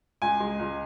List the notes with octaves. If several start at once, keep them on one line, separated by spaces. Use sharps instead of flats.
C#2 G#5
G#3
C#2